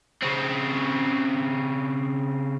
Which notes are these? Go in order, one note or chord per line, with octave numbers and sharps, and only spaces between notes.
C#3 C4